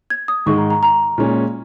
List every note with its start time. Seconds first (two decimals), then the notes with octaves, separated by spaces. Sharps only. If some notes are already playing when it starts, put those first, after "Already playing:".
0.10 G#6
0.28 D#6
0.46 G#2 D#3 G#3 C#6
0.58 A#5
0.70 A#5
0.83 A#5
1.18 A#2 G#3 C#4